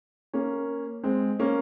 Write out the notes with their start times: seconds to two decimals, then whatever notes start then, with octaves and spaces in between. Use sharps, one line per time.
0.33 A#3 C#4
1.03 G#3 C4
1.39 A#3 C#4